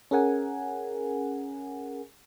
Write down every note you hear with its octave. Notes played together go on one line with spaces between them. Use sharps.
C#4 G#4 A#4 F#5 G#5